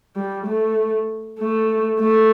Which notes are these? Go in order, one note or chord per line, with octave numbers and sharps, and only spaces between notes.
G3
A3
A3
A3